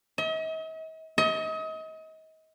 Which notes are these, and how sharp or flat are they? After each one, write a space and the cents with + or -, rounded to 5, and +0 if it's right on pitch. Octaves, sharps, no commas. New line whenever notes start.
D#5 +45
D#5 +35